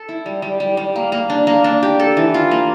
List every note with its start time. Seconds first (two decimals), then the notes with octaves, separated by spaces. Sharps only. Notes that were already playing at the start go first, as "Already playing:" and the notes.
Already playing: A4
0.09 E4
0.26 G3
0.42 G3
0.60 G3
0.77 G3
0.96 A#3
1.12 A#3
1.30 D4
1.47 A#3
1.64 D4
1.83 G4
2.00 A4
2.17 E3
2.34 F4
2.51 A#3